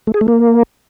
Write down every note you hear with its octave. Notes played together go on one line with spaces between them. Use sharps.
A3
G#4
A3
A#3